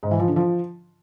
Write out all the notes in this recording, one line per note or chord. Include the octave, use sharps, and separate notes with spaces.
G#2
E3
F3
D3
F3